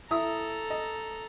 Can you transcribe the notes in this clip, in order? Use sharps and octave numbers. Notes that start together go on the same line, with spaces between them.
E4 A4 E5 A#5 D#6
D#5